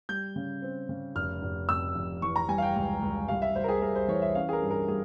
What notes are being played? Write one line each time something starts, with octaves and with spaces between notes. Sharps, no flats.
G3 G6
C#3
C4
C#3
F1 F6
F1
F2 E6
F1
E3 C#6
A#5
G3 G#5
F5
G5
C#2
C#2
C2 F5
E5
C2 C5
A#4
G#4
G3 A#4
C5
E3 C#5
E5
C#4 F5
G#4
A#4
G2
A#4
G3 G#4